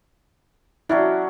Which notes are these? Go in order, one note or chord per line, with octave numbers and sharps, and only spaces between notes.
F#3 C#4 D4 E4